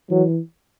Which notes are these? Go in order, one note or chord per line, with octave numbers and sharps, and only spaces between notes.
E3 F#3